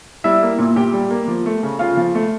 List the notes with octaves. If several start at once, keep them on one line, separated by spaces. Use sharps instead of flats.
G3 E4 E5
A#3
A#2
A#2 G4 G5
G3
A#3
F3
A3
C#3
C#3 F4 F5
F3
A3